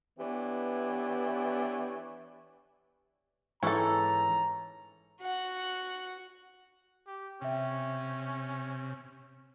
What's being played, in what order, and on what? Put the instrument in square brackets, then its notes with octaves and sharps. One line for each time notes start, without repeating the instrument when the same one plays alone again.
[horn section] E3 B3 D4 G4 C#5
[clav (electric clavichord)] G#2 E3 [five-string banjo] C#4 A4 [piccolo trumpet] A#5
[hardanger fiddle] F#4 F#5
[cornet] G4
[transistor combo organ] C3 [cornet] C#4 [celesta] E5 G5